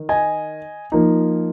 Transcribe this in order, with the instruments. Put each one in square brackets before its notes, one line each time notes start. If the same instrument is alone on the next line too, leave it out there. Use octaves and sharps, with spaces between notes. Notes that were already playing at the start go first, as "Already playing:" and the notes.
Already playing: [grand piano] D#3
D#5 G#5
F3 A#3 D#4